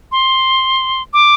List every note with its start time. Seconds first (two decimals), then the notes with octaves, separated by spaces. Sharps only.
0.12 C6
1.13 D6